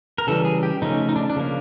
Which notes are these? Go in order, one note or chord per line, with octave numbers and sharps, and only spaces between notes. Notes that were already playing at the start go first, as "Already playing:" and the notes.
A#4
C#3 E3 G3 A4
G#4
G4
C#3 F3 A3 C#4 D#4
D#4
D4
D4
C#3 F3 A#3